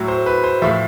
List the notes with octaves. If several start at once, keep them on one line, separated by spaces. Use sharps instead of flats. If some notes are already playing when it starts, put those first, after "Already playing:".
Already playing: A2 F#3
C5
B4
C5
A2 F3 E5